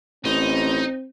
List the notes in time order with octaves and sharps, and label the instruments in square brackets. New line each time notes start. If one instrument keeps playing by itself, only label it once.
[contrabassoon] A1 [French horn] C4 [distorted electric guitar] D#4